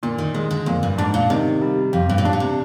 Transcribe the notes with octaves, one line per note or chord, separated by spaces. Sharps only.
A#2 D3
D#3
D#3 G#3
D3
F2 A#2
G2
G#2 D4
A#2
C3 D#3
G3
F2 G4
G2
A#2
G#2 D4
A#2
C3